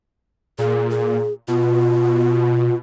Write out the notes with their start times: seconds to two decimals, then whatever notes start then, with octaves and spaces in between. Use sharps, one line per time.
0.59 A#2 G#4
0.90 G#4
1.48 B2 F4